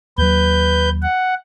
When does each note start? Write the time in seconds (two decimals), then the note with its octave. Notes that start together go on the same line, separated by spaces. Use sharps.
0.18 D#2 F#3 B4 G6
1.02 F#5